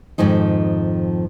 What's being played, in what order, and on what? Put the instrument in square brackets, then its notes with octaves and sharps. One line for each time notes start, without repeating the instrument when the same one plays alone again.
[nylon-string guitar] F2 G#2 D#3 F3 D#4